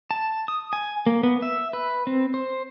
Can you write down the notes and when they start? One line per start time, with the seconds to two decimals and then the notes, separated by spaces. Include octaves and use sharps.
0.11 A5
0.48 D#6
0.73 G#5
1.07 A#3
1.23 B3
1.42 E5
1.73 B4
2.07 C4
2.34 C5